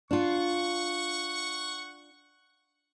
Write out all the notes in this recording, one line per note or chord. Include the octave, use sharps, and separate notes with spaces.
D4 F4 F#5 C#6